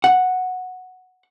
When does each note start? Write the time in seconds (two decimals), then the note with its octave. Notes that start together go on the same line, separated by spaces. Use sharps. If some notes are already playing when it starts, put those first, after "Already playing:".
0.04 F#5